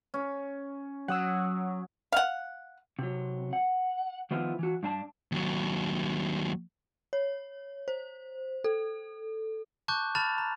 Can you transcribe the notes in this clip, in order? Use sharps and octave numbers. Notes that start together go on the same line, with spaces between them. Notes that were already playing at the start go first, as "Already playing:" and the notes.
C#4
F#3 F#5 D#6 E6
F5 F#5
C3 F#3
F#5
D#3 F3 B3 E4 F4
E3 F#4
G2 D4 A5
D#2 F#3
C#5
C5
A4
A5 C#6 D6 F#6 G6
A5 B5 F6 A6 F7
A#5